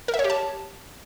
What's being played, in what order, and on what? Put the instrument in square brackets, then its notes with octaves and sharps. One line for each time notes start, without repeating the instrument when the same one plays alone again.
[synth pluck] A#4
E5
C#5
G4
A5